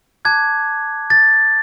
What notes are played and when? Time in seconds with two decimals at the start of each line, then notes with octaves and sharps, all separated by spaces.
0.25 A5 D6 F#6 G#6
1.10 A6